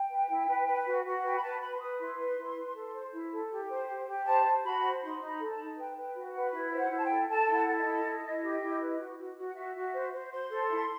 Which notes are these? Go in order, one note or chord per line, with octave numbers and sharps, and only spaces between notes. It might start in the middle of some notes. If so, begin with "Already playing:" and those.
Already playing: G5
B4
E4
B4
B4
F#4
F#4
B4 G5
B5
B4 A5
B4 B5
C6
B4 D#6
E4 C6
B4
E4
B4
A4
C5
E4
A4
G4
C5
G4
G4
C5 A5
C5
F#4 B5
C5
D#4 C6
D#4
B5
A4
A5
D#4
B4 G5
B4
G5
F#4
F#5
B4
E4
E5
C5
F#5
E4
A5
G5
A4
A4 A5
E4
F#5
A4
D#5
E4
E4
E4
G4
E4
B4
F#4
F#4
F#4
F#5
F#4 E5
F#4
C5
C5
C5 C6
A4
E4